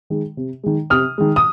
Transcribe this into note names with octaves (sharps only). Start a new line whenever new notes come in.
D#3 G#3
C3
D#3 G#3
C3 D#6 F6
D#3 G#3
D#6